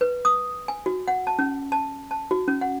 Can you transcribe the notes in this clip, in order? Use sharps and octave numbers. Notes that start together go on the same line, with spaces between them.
B4
D#6
G#5
F#4
F#5
A5
C#4
A5
A5
F#4
C#4
F#5